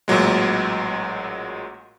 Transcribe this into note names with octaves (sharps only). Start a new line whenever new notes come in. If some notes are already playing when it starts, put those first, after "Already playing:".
A1 A#2 F#3 G#3